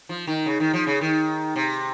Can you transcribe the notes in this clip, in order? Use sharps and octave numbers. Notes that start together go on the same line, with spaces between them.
F3
D#3
C#3
D#3
F3
C#3
D#3
C3